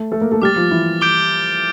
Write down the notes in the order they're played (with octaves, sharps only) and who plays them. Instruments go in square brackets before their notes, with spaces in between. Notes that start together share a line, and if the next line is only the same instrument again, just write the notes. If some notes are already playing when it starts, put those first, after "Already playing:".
Already playing: [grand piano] A3 A4
A3 A4
A#3 A#4
A3 A4
[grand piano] G3 G4 [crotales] D6 F6 A6
[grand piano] F3 F4
E3 E4
[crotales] D6 G6 D7 G7